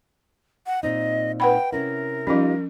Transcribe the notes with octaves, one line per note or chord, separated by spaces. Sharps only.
F#5
A#2 C4 D#4 D#5
B4 F#5 G5 B5
C3 C#4 E4 A#4
F3 G3 C#4 D#4 F4